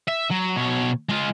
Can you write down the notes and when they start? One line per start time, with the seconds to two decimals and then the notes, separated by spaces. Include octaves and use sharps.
0.08 E5
0.30 F#3
0.56 B2 C#5
1.09 G#3 F4